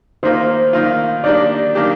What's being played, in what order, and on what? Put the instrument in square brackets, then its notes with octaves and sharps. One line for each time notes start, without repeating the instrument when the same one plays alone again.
[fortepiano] D#3 A#3 F4 [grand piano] C5
[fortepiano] D#3 A#3 F4
[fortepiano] D#3 A#3 D4 G4 [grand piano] D5
[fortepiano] D#3 A#3 D4 G4